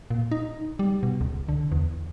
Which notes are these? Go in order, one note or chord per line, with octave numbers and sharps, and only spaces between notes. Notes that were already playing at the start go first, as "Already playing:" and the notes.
A#2
D#4
G3
B2
C#2
D3
E2